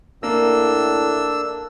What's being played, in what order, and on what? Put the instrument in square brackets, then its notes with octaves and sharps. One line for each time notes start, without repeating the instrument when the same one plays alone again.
[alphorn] A2 [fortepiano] A#3 [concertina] D4 E6